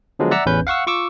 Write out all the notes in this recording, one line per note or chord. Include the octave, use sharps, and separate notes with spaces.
D3 F3 F#3 G#3 B3
D5 E5 F#5 A#5 E6
A1 E2 C#4 B4 G6
F5 F#5 C#6 E6
F4 C#6 D6 E6